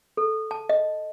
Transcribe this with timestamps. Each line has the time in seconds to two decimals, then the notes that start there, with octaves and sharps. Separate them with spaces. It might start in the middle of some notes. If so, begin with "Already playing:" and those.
0.17 A4
0.51 A5
0.69 D#5